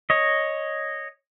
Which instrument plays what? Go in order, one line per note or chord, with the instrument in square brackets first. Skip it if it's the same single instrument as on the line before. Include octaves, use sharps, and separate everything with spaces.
[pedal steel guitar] C#5 D#5